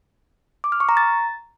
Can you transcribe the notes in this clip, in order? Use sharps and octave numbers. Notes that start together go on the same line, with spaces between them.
D6
F6
C#6
A#5
A6